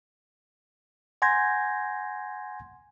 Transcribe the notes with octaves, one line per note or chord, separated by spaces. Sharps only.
F#5 G#5 C6 G6 G#6 A#6